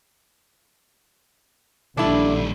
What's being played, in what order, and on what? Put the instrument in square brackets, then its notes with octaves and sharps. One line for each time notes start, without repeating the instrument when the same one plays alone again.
[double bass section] A#1 [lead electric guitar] D#2 G3 [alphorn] D3 [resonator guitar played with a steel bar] D4 E4